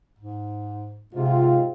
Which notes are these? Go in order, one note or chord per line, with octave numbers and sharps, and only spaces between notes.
G#2
G#2 C3 C4 F4